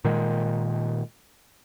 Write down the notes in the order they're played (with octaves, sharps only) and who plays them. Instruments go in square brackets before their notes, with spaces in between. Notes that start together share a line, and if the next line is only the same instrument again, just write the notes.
[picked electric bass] A#2 D#3 G#3